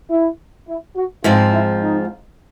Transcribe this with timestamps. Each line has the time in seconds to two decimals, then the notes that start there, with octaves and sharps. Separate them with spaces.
0.10 E4
0.68 E4
0.96 F#4
1.24 G#2 F3 G#3 C4 F4
1.52 E4
1.81 D#4